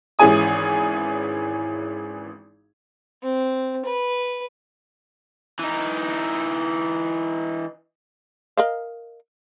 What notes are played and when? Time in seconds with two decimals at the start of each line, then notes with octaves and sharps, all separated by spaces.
0.19 G#1 E3 C#4 G#4 G#5 D#6
3.23 C4
3.85 B4
5.59 E3 D#4
8.57 A#4 D#5 F5